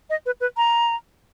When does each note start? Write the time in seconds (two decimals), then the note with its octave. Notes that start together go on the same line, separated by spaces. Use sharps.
0.10 D#5
0.26 B4
0.41 B4
0.57 A#5